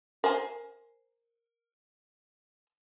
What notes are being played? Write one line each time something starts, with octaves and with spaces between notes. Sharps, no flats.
A#4 C5 G#5